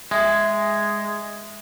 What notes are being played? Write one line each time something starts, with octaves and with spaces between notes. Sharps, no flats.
G#3 E5